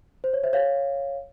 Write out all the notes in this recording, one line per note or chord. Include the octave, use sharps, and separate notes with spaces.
C5
C#5
C5 E5
C#5 F5